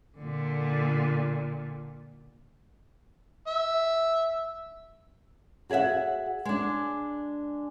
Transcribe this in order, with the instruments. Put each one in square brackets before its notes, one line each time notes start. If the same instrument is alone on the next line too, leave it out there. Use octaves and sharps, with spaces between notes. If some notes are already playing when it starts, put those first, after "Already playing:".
[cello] A#2 D3
[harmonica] E5
[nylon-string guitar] F#4 G#4 D5 E5 F#5
G#3 D4